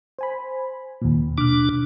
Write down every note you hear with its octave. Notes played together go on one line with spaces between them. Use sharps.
C5 G#5 B5
D#2 A#2
B2 D4 D6 F6